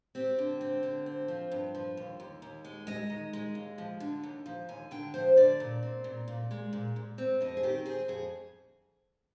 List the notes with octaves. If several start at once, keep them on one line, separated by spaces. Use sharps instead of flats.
C4 G4
D3
C4
D3
C4
F3
G2
F3
D#2
D#2
D#2
G#3
G#3 D#5
D#3
G#3
D#2
F3
D3
D#2
F3
D#2 G#5
D3 G5
F3 C5
D3 D5
A#2
C4
A#2
A#2
G#3
A#2
A#2
C4
F2 D#5
G#4
D#3 G4
C4 G#4
F2 G#4